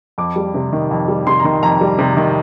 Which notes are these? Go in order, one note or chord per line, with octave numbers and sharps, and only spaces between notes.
F2 D6
G3
C3
D#3
F2
G3
C3 C6
A#5
D#3 C6
F2 A#5
G3
C3
D#3